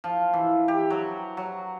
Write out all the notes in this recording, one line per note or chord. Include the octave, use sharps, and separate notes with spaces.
F3
E3
G4
F#3
F#3